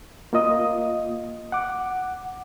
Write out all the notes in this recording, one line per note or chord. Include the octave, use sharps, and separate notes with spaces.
A#3 F4 D#5 D#6
F#5 D6